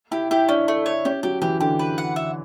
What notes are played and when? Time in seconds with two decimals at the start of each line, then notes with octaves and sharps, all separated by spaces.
0.11 E4 G4
0.31 E4 G4
0.49 C#4 D4
0.68 A3
0.86 C#5
1.05 C#4 G4
1.23 F#3 G4
1.42 E3 G4
1.60 D3 G4
1.79 B4
1.98 F#5
2.16 E5